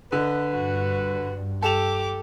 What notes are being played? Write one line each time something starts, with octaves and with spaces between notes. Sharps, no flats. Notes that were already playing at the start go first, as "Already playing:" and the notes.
D3 B4 D#5
G2 F#4
G4 A4 D6 E7 F7